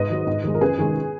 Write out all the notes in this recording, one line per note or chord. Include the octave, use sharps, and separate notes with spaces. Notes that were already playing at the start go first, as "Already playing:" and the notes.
Already playing: G#2 B4 D#5
D#3 F#3
G#2
D#3 G#3
A#4
F#2 G#4 B4
D#3 G#3